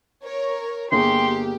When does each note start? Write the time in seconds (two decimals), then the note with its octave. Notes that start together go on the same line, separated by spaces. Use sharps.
0.23 A#4 C#5
0.92 G1 A#3 G4 G#4 C6